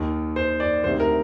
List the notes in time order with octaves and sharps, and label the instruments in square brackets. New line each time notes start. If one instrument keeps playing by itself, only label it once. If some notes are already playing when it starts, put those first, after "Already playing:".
Already playing: [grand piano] D#2 D#3
C5
D5
D2 C3 D#3 C5
A#4